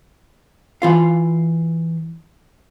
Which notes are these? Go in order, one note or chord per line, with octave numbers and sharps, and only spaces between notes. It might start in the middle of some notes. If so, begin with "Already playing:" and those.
E3 F4 F5